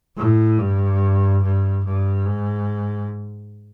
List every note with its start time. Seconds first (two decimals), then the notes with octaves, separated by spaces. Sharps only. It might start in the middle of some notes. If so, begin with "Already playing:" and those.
0.17 A2
0.58 G2
1.43 G2
1.85 G2
2.26 G#2